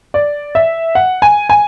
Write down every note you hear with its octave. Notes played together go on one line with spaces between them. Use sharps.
D5
E5
F#5
G#5
G#5